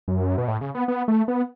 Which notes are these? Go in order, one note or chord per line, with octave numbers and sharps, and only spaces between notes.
F#2
B2
A2
C#3
B3
B3
A3
B3